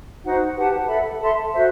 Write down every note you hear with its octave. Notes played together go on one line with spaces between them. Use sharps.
D#4 F#4 C5 F#5
G4 B4 F#5 A5
A4 E5 B5
A4 E5 A5 C6
F#4 C5 E5